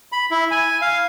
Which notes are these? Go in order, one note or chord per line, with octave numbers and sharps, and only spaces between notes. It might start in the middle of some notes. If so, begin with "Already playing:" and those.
B5
E4
G#5
F5